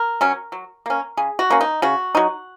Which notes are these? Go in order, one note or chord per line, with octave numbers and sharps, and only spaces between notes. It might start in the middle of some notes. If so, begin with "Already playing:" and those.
Already playing: A#4
F#3 C#4
F#3
A#3 C#4
C#3 G#4
F#4
A#3 C#4
D#4
C#3 F#4
F#3 D#4